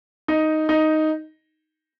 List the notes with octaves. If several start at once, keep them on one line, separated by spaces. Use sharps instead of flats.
D#4
D#4